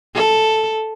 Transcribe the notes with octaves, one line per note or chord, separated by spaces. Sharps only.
A4